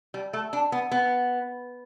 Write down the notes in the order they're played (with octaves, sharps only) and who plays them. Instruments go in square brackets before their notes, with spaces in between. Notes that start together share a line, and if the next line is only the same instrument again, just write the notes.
[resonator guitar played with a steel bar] G3
A3
D4
B3
B3